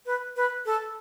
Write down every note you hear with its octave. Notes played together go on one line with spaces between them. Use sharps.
B4
B4
A4